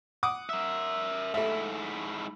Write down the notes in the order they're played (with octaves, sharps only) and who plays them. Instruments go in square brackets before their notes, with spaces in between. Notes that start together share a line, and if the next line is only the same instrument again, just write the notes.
[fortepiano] F#5 D6 D#6
[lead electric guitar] A#4 E5
[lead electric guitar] G#2 E4 [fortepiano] A3 E5